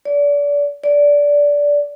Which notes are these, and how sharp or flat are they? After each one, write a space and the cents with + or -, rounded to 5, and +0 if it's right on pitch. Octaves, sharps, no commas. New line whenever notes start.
D5 -30
D5 -15